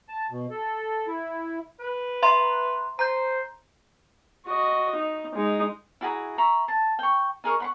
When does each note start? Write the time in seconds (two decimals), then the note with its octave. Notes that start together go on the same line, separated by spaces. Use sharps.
0.09 A5
0.31 B2
0.50 A4
1.08 E4
1.81 B4
2.23 E5 A#5 C6
2.99 C5 A#5 G6
4.46 F#4 D#5
4.95 D#4
5.35 G#3 D#4
6.01 E4 F#4 G#4 A#5
6.38 E5 A#5 B5 C#6
6.68 A5
6.99 G5 C#6
7.44 D#4 G#4 A#4 C#6
7.60 F#5 B5 C#6